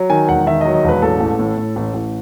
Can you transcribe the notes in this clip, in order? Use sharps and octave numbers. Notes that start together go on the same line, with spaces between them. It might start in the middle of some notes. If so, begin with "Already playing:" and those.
Already playing: F#3
D#3 G#5
E1 F#5
D#3 E5
D#5
F#3
D#5
E1 B4
A1 A4
A1
A2
A2
A1
A1